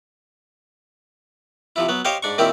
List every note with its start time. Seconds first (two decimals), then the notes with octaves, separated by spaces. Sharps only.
1.76 C3 F3 E4
1.89 F#3 B3
2.05 G4 C5 C#5 D#5 F5 G5
2.23 G#2 D4 C#6
2.38 A#2 D#3 C4 C#4 E4 G4